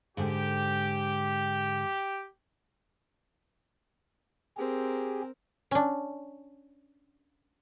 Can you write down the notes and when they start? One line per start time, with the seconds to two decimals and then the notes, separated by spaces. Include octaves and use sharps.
0.17 G#2 D3 G4
4.57 C4 G4 G#4 A#4
5.71 C#4 D4